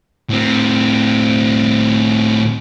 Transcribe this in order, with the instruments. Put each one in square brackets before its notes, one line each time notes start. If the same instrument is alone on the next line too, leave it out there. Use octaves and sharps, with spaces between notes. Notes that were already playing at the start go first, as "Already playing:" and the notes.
[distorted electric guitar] A2 C4